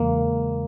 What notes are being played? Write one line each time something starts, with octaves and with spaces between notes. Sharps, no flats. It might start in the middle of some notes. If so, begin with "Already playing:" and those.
Already playing: E2 C#3 E3 G#3 A#3